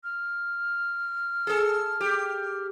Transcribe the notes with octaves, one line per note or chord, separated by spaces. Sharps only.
F6
G#4 A4
G4